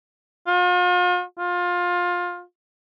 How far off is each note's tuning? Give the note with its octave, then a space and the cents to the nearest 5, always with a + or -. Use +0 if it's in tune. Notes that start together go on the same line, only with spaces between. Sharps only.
F4 +40
F4 +20